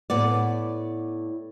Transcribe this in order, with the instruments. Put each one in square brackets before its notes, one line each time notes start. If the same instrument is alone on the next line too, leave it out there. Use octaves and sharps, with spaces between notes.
[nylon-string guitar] A2 B3 D5